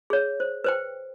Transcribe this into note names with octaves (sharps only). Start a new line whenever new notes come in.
G#4 C#5
C5
B4 C5 G5